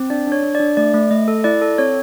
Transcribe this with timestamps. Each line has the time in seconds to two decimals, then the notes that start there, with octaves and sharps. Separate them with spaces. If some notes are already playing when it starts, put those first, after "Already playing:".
Already playing: C4
0.10 D4 D5
0.27 D4 C#5
0.43 D4
0.55 D5
0.60 D4
0.77 A3 D5
0.94 A3
1.11 A3 D#5
1.28 A4
1.44 E4 D5
1.62 A4
1.78 C4 C#5